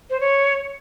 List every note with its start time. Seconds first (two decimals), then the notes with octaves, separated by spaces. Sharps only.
0.10 C5
0.20 C#5